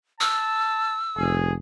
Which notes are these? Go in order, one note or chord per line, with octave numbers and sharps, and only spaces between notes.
A5 E6
F1 G#4